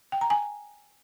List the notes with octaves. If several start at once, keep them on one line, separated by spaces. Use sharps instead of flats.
G5
A#5
G#5